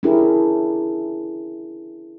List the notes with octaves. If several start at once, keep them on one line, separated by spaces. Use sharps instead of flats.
C#4 D4 E4 G4 G#4 A#4